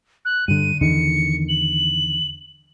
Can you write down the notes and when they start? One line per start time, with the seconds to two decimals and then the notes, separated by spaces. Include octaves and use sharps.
0.25 F#6
0.48 G2 D3 D#7
0.81 E2 D3 D#3 C#7
1.49 F#7